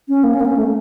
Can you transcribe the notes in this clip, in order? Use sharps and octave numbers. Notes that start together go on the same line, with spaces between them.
C#4
A#3
C#4
A#3
C#4
A3